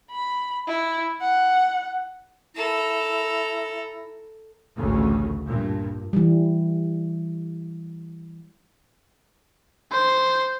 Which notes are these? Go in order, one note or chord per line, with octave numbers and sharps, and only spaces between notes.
B5
E4
F#5
E4 A4 A#5
A1 D2 C#3
G2 A#2
E3 G3
C5